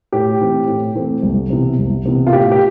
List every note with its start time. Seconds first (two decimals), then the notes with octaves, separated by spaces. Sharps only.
0.12 A2 G4
0.40 E3 A3 C4
0.67 A2
0.95 E3 A3 C4
1.23 C2
1.50 C3 E3 B3
1.78 C2
2.06 C3 E3 B3
2.27 F4
2.33 A2 G4
2.51 G4